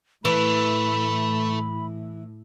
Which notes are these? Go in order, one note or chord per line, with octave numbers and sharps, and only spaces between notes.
A2 E3 A3 B5